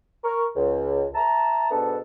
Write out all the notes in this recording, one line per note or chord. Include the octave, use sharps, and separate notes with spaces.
A#4 C#6
C#2
E5 A5 A#5
G#2 B2 B3 D4 A4